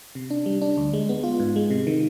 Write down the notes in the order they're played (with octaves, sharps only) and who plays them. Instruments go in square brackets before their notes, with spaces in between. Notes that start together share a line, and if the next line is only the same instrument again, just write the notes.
[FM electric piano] C3
D4
G3
D4
D2
G#3
B3
F4
G#2
G#3
C3
D#3